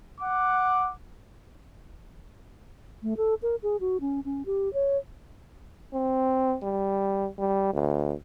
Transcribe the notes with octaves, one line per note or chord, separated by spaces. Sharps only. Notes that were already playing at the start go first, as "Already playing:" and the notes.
F#5 D6
A3
A4
A#4
G#4
F#4
C#4
C#4
G4
C#5
C4
G3
G3
D2